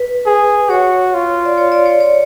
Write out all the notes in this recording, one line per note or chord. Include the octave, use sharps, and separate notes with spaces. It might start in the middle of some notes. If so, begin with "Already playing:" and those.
Already playing: B4
G#4
F#4 C#5
F4
D5
C#5
D5
C#5
C#5